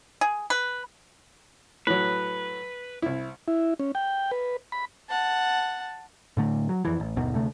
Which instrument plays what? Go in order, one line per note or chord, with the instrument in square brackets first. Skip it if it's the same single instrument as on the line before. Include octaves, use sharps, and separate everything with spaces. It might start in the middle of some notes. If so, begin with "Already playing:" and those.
[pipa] G#4
B4
[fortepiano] A2 F#3 [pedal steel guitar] B4
[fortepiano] C2 E4
[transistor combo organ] E4
C#4
G5
B4
B5
[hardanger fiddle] F#5 A5
[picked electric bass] A2 D3 A3
F#3
F2 E3
A1
G1 D#2 B2 D#3
D2 C3 A3